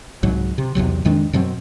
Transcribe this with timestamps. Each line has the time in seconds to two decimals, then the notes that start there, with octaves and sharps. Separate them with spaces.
0.23 C2 G#2 F#3
0.58 C3
0.75 B1 E2 C3 F#3
1.05 F2 D#3 G#3 D4
1.33 F#2 B2 F#3 C4